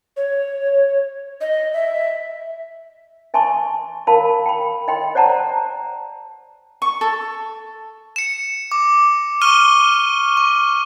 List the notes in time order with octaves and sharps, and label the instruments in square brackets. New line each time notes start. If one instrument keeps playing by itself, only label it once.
[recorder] C#5
D#5
E5
[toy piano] E5 G#5 A5 C6 C#6
A#4 F5 A5 B5
G5 B5
D#5 G5 C6
C5 D5 F#5 A5 A#5
[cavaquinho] C#6
A4
[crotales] C#7 E7
D6
C#6 F6 D#7 G7
C#6